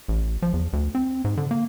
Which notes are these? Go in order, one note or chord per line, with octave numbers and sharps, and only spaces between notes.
A1
F3
E2
D2
C4
G#2
D3
A#3